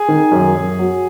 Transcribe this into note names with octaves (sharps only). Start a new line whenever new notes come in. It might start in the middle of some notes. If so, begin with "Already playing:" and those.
Already playing: G#4 G#5
D#3
F#2
F#2
F#3